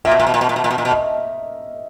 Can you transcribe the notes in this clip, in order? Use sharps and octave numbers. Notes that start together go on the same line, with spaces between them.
A#2 E5
B2
A#2
B2
A#2
B2
A#2
B2
A#2
B2
A#2
B2
D#5